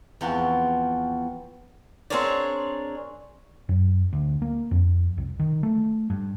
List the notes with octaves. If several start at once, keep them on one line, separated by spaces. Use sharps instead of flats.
E2 F3 C4 F#5 G5 C#6
C4 D4 G#4 A#4 C#5 D5
F#2
D2
A#3
F2
C2
D#3
A3
G2